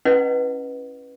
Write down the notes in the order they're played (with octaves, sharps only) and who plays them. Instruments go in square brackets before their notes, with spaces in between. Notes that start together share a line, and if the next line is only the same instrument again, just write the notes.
[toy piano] C#4 E4 B4 D#5 F#5